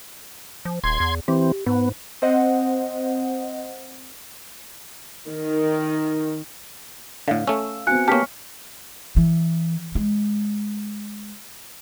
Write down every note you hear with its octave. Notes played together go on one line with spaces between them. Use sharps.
F3
D#1 C6 G#6
E2
E3 C4 G4
G#2 B3
C4 C5 D#5 F#5
D#3
A2 D3 F5
A3 C#4 E6
B3 C4 F#4 F5 G#5 F#6 C#7
A#3 B3 G4 C#5 A5 C#6 F6 B6
E3
G#3